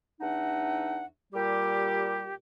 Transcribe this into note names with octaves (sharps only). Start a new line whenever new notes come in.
E2 D4 D#4 E5 F#5
A#2 G3 G4